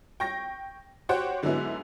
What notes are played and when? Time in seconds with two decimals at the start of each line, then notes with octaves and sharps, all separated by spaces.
0.20 G5 C#6 A#6
1.09 F#4 G4 C5 C#5 F#5 G5
1.42 G#2 D3 F#3 G#3 B3 E4